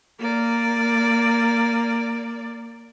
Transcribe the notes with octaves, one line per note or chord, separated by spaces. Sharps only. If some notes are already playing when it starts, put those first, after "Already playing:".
A#3 D5